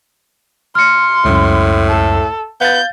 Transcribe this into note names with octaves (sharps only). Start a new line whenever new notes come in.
C6 F6 C#7
C#2 F#2 A2
A4
B3 F5 G6 A6